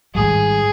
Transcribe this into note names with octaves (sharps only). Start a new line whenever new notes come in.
G#1 G#2 G3 G#4